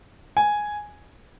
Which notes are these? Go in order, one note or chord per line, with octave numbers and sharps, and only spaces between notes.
G#5